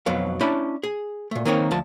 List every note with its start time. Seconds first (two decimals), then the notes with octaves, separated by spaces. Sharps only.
0.06 B1 F2 B2 F#3 F5
0.41 C#4 D4 E4 A5 B5
0.83 G#4
1.31 A#2 A3
1.45 D#3 A#3 C4 D#4 G#4 C#5
1.71 D2 F3 A5